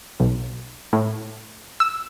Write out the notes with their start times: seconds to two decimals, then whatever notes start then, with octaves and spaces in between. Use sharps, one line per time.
0.20 B1
0.93 A2
1.80 E6